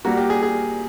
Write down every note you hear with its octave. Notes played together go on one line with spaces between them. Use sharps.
A#2 G3 A#3 F#4
G4
G#4
G#4